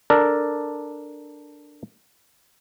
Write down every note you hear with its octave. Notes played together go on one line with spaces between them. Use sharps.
D4 A4 A#4 D5